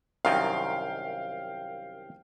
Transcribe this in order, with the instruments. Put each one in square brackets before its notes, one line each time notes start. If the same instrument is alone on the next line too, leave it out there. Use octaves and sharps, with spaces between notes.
[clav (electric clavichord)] C2 F#2 D#3 [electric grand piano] F5 G5